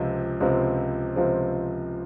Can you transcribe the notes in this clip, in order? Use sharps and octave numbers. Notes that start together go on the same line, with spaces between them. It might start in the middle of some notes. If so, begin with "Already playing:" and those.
Already playing: C#2 C3 F3 C4
C#2 C3 F3 C4
C#2 C3 F3 C4